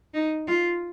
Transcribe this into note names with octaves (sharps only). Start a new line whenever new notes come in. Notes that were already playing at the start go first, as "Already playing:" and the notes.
D#4
F4